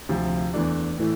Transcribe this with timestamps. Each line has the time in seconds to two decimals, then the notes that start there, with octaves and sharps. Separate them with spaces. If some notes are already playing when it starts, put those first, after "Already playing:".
0.09 D2 C3 F3
0.54 E2 E3 A3 D4
0.98 A2 E3 A3